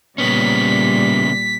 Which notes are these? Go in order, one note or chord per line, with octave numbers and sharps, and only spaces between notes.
A#2 C#3 G3 B3 C#4 B6